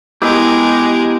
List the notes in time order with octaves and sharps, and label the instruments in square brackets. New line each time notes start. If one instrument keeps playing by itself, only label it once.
[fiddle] G#3 A#4 [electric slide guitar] B3 E4 G4